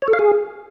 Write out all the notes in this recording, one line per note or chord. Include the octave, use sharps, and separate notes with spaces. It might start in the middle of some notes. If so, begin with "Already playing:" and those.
C#5
A4
F5
G#4